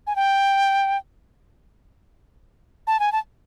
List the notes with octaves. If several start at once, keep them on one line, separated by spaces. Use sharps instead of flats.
G#5
G5
A5
G#5
A5